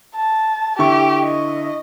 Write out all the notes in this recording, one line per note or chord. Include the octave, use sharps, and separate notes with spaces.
A5
D3 E4 G4 C#6
D#5